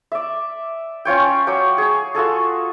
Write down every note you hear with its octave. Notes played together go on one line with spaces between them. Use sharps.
D5 E5
C#4 F4 C#5 G5
F#3 D5 G5
G#4 C#5
F4 F#4 G#4 A4